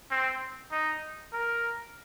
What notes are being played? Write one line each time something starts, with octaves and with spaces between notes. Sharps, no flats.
C4
D#4
A#4